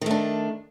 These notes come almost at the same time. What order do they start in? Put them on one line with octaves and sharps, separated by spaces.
D#3 A3 D4